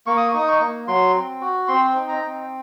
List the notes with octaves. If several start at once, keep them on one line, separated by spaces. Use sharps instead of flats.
A#3 C#6
D#6
C#6
D#4 D#6
C#6
A#3
F#3 C6
C4
F#4
C4 C6
D#4
A#5
C4